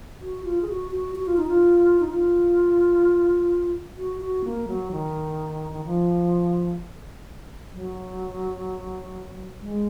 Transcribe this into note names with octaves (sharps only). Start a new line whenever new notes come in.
F#4
F4
G#4
F#4
F#4
F#4
F4
D#4
F4
D#4
F4
F#4
F#4
A#3
F#3
D#3
D#3
F3
F#3
G#3